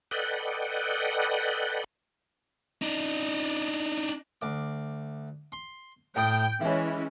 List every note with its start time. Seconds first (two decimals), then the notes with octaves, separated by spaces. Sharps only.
0.11 A4 B4 D5 D#5 F#5 G5
2.82 D4 D#4
4.42 D2 D6
5.52 C6
6.16 A2 G5 D#6
6.61 E3 G#3 C#4 E4